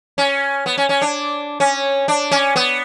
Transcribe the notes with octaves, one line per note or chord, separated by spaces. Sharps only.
C#4
B3
C#4
C#4
D4
C#4
D4
C#4
B3